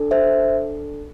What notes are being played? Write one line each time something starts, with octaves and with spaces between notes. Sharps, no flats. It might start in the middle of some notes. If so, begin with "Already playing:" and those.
Already playing: D4 A4
C5 E5